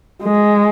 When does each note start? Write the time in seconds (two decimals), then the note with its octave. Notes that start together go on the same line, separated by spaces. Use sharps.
0.24 G#3